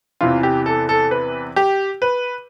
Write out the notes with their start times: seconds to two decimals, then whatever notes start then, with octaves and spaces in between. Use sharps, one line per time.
0.21 E2 C3 E3 F4
0.43 G4
0.66 A4
0.89 A4
1.11 B4
1.56 G4
2.02 B4